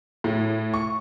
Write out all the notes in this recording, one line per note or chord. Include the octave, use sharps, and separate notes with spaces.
A2
C#6